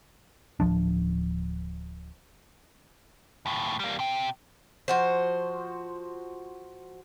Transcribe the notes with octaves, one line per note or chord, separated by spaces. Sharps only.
D1 F2 F3 D4
D#2 A2
G3 A#3
C3 G5
F3 F#4 C5